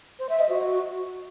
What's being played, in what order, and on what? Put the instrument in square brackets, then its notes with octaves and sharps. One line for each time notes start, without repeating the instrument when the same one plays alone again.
[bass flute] C5
E5
D#5
F#4